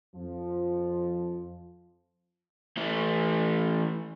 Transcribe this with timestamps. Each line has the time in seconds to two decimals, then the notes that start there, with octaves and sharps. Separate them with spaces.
0.15 F2 F3
2.77 E3 A3